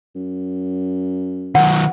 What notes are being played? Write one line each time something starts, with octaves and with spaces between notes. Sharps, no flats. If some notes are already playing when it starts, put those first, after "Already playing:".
F#2
D#3 F#3 F#5